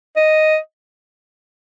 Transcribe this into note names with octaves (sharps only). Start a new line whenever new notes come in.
D#5